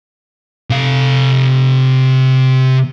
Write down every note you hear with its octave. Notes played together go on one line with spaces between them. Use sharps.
C3 F5